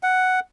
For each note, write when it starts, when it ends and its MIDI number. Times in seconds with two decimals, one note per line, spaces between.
0.03 0.40 78